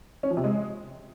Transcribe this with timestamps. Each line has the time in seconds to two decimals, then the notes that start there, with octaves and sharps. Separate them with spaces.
0.23 C#4
0.30 F3
0.37 C3
0.44 G#3